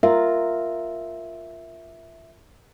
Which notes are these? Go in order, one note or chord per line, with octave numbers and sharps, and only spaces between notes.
F4 A#4 E5